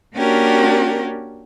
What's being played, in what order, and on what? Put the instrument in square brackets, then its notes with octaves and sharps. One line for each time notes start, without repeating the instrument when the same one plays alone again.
[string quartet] A#3 C#4 D4 F#4 G4 A#4